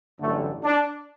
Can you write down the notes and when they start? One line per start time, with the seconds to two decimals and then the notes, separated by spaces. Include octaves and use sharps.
0.19 A1 G2 D3 F#3 A3
0.63 D4